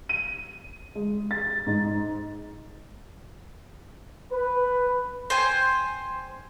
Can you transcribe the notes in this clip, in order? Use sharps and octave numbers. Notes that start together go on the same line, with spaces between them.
D#7
G#3
A6
G#2
B4
C5 G5 G#5